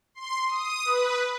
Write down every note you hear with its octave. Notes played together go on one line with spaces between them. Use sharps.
C6
D#6
B4